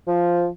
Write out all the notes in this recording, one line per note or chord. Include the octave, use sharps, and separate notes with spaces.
F3